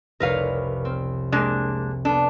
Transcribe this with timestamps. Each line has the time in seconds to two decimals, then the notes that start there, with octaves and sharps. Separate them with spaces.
0.20 F1 C2 A#4 B4 C#5 F5
0.85 C4
1.32 G#3 A#3 D4
2.05 B3 D4 A4